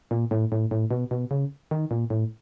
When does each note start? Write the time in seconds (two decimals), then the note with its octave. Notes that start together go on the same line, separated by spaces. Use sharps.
0.11 A#2
0.31 A2
0.52 A2
0.71 A2
0.91 B2
1.11 B2
1.31 C#3
1.71 D#3
1.91 A#2
2.10 A2